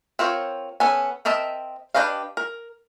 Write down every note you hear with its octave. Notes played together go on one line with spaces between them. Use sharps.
C4 F4 A#4 C#5
B3 C#4 A4 G#5
C4 A#4 D#5 E5 A5
D4 G4 B4 D#5 F5
A#4